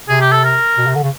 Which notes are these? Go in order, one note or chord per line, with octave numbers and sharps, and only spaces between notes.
C3 G#4
G4
A4
A#4
B2
C3
D3
C#3